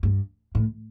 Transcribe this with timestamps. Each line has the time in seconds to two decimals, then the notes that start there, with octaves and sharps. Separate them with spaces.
0.03 G2
0.55 A2